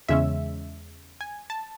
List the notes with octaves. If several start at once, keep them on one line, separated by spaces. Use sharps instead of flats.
E2 C#3 G#3 C#4 E5
G#5
A5